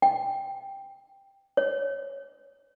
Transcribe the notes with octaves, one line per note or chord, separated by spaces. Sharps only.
G5
C#5